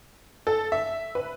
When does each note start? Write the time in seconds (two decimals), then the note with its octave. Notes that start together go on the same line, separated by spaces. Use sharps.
0.47 A4
0.72 E5
1.15 B4